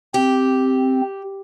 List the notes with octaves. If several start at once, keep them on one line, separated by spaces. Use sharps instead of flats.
C4 G4